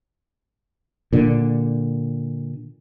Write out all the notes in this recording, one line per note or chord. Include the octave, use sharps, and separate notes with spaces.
A#2 D3